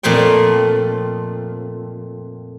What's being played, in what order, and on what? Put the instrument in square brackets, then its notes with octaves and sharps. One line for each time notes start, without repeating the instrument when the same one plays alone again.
[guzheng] F2 A#2 A3 C5 G5